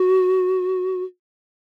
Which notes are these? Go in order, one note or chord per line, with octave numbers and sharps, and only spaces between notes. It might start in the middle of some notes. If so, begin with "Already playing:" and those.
Already playing: F#4